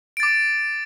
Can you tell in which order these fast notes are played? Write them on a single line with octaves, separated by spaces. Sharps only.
D7 A6 D6